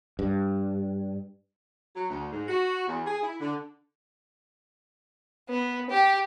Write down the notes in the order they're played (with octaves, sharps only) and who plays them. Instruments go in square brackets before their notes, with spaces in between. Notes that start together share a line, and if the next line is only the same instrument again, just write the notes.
[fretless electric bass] G2
[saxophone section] F#3
D2
G#2
F#4
E2
G#4
E4
D3
[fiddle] B3
G4